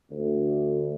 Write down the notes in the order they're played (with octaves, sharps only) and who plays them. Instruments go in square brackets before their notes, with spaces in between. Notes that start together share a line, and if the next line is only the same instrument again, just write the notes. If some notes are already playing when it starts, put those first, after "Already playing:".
[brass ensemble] D2